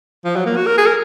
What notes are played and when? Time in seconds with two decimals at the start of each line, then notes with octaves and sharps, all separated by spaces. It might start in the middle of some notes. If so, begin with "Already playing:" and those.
0.25 F3
0.36 F#3
0.46 A#3
0.56 F#4
0.67 A#4
0.78 G#4
0.86 A#4